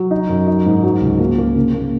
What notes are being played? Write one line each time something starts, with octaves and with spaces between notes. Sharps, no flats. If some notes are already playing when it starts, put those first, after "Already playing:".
Already playing: F#3
D#4
F#2
D#4
G#2
F#3
C#2
A#3
A#3
C#3
A#3